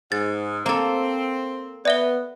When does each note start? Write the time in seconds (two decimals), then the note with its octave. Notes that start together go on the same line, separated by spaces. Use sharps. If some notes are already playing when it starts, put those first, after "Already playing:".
0.12 G#2 A6
0.66 A#3 C4 A4
1.85 B3 D5 E5 G7